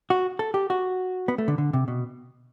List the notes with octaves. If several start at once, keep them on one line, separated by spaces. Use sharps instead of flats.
F#4
A4
G4
F#4
B3
A3
D3
D3
C3
B2